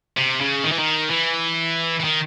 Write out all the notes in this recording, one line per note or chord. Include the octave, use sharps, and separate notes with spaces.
C3
C#3
D#3
E3
D#3
E3
E3
D#3